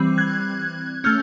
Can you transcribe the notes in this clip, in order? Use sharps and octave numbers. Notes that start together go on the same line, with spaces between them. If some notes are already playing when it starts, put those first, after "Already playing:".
Already playing: E3 G3 C4
F#6 G#6
A3 C#4 F6 G6